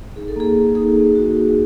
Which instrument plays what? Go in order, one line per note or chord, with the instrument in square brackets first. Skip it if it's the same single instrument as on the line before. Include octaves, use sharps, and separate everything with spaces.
[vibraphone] D#4 G#4
A4
A#3 G#4
A#3
D#4 G#4
A#3
F#4
D#4